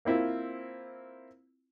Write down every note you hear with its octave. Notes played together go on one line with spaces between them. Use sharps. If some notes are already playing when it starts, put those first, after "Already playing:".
A#3 C4 E4 F4